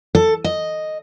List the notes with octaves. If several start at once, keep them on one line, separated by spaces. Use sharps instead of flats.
A4
D#5